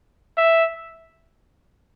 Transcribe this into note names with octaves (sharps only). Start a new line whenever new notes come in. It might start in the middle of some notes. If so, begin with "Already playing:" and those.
E5